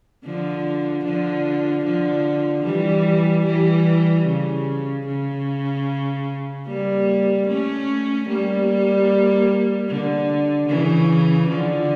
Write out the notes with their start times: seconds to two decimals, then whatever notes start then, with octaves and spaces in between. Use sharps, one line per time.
0.24 D3 F3
1.04 D3 F3
1.84 D3 F3
2.65 E3 G3
3.46 E3 G3
4.26 C#3
5.06 C#3
6.66 G3 A#3
7.47 A3 C#4
8.28 G3 A#3
9.88 D3
10.68 C#3 E3
11.48 D3 F3